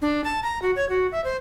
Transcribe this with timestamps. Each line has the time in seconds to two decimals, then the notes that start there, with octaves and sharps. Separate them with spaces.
0.02 D4
0.24 A5
0.43 A#5
0.62 F#4
0.76 C#5
0.89 F#4
1.12 E5
1.24 C5